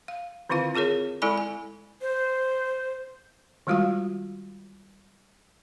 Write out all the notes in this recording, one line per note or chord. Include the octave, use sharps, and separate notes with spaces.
F5
D3 D#3 C4 E4 F4 F5
C4 F4 G#4 A#4 C#5
G#3 E4 A4 D5 G#5 B5
G#5
C5
D#3 G3 G#3 F4 F#4 F5